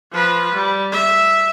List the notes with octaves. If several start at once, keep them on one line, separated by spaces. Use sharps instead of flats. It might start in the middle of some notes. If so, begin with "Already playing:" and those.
F3 B4
G3
E5